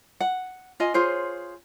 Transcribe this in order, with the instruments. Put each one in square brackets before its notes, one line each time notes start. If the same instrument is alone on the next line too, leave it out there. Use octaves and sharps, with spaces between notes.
[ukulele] F#5
F4 D#5 G#5
F4 G#4 C5 C#5